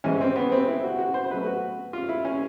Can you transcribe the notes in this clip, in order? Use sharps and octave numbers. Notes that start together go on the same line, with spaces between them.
G#2 E3 G#3 C#4
C4
B3
C4
E4
F#4
F#4
C5
B2 F#3 A3 B4
F#4
F4
E4
C#4